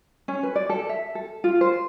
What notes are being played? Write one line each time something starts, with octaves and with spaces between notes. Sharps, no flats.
C#4
B4
D5
A4
E5
A4
F4
C5